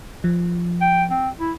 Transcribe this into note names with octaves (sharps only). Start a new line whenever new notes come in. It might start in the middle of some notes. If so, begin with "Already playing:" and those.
F3
G5
C4
E4